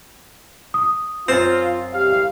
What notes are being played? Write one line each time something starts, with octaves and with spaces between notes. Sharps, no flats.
D#6
F#2 C4 F4 C5
C2 G4 F5